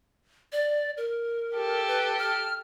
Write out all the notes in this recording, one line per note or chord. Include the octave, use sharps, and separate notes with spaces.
D5
A#4
G4 A4
B4
F6